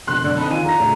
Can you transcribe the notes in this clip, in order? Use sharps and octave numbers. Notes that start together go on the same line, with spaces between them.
F2 B2 D3 C6 F#6
F#2 B2 D3 D5
C4 D#4 A4 B5
D#3 F4 G#5 D#7
E2 A#5 A#6
A#1 C#3 A3 C#4